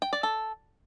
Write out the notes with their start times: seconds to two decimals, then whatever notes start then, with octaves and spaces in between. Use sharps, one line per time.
0.02 G5
0.13 D5
0.23 A4